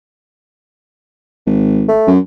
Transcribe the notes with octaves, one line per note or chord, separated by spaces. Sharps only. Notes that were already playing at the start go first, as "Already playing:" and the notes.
G#1
A3
F#2